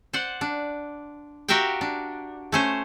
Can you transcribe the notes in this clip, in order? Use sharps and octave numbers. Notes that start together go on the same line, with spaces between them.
C5 D5 F#5
D4
F#4 G4 A#4 E5 F5 G5
D4
A3 C#4 C5